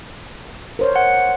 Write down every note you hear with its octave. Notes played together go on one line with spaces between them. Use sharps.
A#4 C5 C#5
F#5